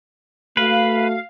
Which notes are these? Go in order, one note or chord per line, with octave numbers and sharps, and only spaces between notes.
A3 F#4 B4 F5